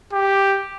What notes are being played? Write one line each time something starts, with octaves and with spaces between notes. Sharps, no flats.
G4